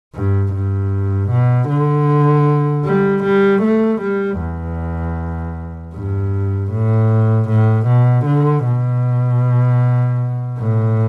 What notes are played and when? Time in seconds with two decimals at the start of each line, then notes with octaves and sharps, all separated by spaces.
0.15 G2
0.53 G2
1.31 B2
1.69 D3
2.85 G3
3.24 G3
3.62 A3
4.01 G3
4.39 E2
5.95 G2
6.72 A2
7.49 A2
7.87 B2
8.26 D3
8.64 B2
10.58 A2